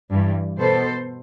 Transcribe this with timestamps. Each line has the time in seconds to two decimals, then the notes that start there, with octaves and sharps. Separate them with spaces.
0.11 G2 E3 G3
0.59 B2 B3 A4 C5